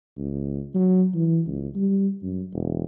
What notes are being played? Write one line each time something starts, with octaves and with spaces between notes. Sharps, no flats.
C#2
F#3
E3
C#2
G3
F#2
E1